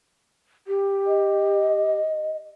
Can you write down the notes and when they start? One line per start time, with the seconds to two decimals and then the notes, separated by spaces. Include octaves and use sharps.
0.67 G4
1.07 D#5